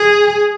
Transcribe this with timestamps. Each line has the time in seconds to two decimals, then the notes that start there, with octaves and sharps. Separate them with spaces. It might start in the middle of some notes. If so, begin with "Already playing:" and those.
Already playing: G#4